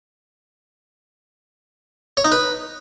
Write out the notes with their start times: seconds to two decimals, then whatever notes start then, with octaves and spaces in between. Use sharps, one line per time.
2.17 C#5
2.25 D#4
2.32 B4